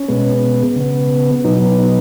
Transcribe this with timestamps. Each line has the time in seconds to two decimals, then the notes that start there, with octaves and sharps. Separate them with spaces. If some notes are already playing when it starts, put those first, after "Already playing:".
Already playing: C#4
0.08 B2 G#3 B3
0.76 C#3 B3
1.44 B2 F#3 B3 D#4
1.78 D#4